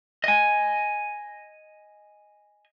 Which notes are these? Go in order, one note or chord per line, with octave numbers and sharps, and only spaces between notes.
D#5 G#5